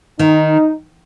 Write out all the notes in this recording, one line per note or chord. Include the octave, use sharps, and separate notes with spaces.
D#3 D#4